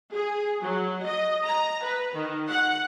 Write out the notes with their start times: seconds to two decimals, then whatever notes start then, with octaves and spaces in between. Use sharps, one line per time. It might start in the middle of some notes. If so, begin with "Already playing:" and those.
0.14 G#4
0.63 F#3
1.05 D#5
1.48 A#5
1.83 B4
2.14 D#3
2.49 F#5